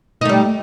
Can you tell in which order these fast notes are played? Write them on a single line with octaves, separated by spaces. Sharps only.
D#4 A3 G3